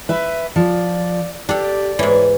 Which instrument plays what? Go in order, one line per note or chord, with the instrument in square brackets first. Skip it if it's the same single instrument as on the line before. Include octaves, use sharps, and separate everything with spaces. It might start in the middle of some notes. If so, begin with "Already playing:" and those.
[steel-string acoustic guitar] B4 E5
[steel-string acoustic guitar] F3 [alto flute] D5
[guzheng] D4 A4 [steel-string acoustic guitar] G4 [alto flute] D5
[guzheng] G#2 E3 [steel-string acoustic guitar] C#5